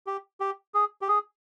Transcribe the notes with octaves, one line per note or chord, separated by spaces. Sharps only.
G4
G4
G#4
G4
G#4